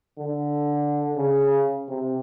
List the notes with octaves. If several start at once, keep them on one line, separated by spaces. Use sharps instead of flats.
D3
C#3
C3